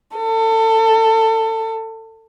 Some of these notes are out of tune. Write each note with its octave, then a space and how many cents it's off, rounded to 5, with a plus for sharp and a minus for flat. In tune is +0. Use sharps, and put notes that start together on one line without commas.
A4 +25